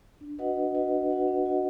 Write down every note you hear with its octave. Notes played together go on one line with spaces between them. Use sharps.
D4
F#4 B4 D#5 F#5
D4
F#4 B4 D#5 F#5
D4
F#4 B4 D#5 F#5
D4
F#4 B4 D#5 F#5